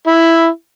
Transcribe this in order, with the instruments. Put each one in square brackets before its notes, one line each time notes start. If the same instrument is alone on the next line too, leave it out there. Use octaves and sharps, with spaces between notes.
[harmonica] E4